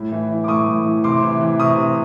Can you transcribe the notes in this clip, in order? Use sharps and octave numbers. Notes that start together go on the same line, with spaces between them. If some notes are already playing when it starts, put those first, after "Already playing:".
Already playing: A2
E3
E3
D6
A2 C#6 D#6
A2
E3
C3 C6 D6
E3
E3
C3 C#6 D#6
C3